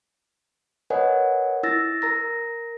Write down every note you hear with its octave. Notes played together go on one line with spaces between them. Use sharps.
A#4 B4 C#5 D#5 F#5 G#5
E4 E6 A6 A#6
A#4 A#5 A#6